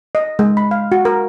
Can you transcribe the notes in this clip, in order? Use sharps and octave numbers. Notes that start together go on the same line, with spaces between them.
D#5
G#3
B5
F5
F#4
A#4